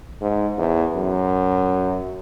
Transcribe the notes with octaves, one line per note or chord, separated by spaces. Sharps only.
G#2
E2
F#2